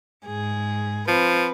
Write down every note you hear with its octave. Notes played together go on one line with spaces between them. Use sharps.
G#2 G#4
F3 C4 B4